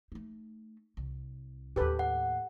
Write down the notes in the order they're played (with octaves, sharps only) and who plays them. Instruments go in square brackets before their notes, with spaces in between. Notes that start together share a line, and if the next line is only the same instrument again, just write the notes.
[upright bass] A3 D#4
C2
[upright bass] D#2 A2 [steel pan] G4 A4 B4
[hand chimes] F#5